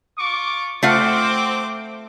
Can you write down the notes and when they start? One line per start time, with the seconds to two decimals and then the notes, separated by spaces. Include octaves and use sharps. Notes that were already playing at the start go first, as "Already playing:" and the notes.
0.18 F4 C#6 D6
0.83 A3 C4 F4 C5 F#5 D6